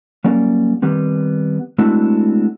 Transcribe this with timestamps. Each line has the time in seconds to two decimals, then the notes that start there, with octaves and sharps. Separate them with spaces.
0.24 F#3 G3 A#3 C#4 D5
0.82 D#3 G3 B3 C4
1.78 G#3 A3 C4 D4 E4 F#4